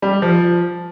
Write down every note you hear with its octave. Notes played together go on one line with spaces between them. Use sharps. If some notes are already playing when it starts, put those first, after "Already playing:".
G3
F3